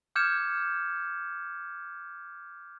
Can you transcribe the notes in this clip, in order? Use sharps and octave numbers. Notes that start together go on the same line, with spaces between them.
D6 F6 G6 G#6 C#7 E7